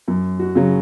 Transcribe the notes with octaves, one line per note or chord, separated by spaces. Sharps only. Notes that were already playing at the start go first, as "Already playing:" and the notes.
F#2
F#4
C#3 F#3